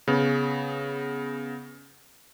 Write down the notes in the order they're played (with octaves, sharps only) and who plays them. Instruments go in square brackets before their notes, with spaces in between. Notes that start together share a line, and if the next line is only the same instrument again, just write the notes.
[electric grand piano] C#3 B3